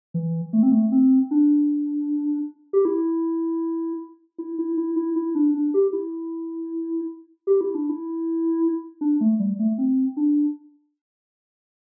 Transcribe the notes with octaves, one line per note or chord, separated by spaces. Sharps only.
E3
A3
C4
A3
C4
D4
G4
E4
E4
E4
E4
E4
E4
D4
D4
G4
E4
G4
E4
D4
E4
D4
A3
G3
A3
C4
D4